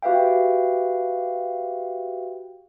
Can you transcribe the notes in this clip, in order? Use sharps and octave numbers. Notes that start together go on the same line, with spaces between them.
F#4 G4 B4 E5 F5 G5